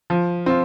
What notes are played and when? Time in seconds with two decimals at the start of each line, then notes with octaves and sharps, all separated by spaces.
0.10 F3
0.46 C4 F4